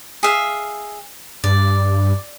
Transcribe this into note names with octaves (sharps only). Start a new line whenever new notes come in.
G#4 E5 F5
G2 D5